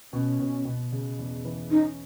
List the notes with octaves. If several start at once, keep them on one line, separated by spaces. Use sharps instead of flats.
B2 C#4
B2
B2
C#3
E2
E3
C#4 D#4